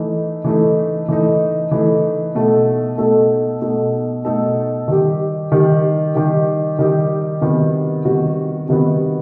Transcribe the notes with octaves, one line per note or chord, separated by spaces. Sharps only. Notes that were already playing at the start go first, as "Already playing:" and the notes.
Already playing: E3 A3 D#4
E3 A3 D#4
E3 A3 D#4
E3 A3 D#4
B2 A3 D#4 A4
B2 A3 D#4 A4
B2 A3 D#4 A4
B2 A3 D#4 A4
D#3 G3 D#4 G4
D#3 G3 D#4 G4
D#3 G3 D#4 G4
D#3 G3 D#4 G4
C3 D#3 G3 B3 F#4
C3 D#3 G3 B3 F#4
C3 D#3 G3 B3 F#4